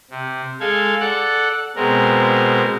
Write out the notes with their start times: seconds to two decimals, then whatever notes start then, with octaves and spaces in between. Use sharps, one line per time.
0.10 C3
0.60 G#3 A4 F5 G#6
1.00 A4 D5 F#5 F#6
1.76 B2 G#3 C4 A#4